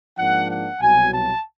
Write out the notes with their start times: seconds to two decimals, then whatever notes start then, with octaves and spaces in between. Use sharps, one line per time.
0.18 G#2 F3 A#3 D4 F#5
0.50 F#5
0.80 C2 B2 F#3 G#5
1.12 A5